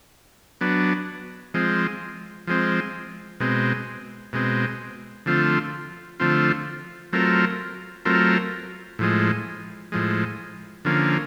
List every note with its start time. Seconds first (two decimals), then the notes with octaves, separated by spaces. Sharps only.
0.61 F#3 B3 D4
1.54 F3 G#3 C4
2.47 F3 G#3 C4
3.40 B2 G#3 C4
4.33 B2 G#3 C4
5.26 D3 F3 A3 C4 F4
6.19 D3 F3 A3 C4 F4
7.13 F#3 A3 C4 F4 A#4
8.05 F#3 A3 C4 F4 A#4
8.99 A2 F3 G#3
9.92 A2 F3 G#3
10.85 D3 F3 A#3 C#4